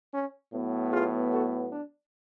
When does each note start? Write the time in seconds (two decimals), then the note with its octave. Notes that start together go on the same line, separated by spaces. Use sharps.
0.13 C#4
0.53 A2 F#3 B3
0.92 F4 G#4
1.31 F#4 A4
1.70 D4